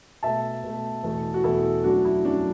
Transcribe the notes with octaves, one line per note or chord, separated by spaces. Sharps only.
B2 A3 E5 A5
B2 A3
E2 B2 A3
F#4
E2 B2 A3 E4 A4
F#2 F#3 A3 D4 F#4
E4
F#2 F#3 A3 D4 F#4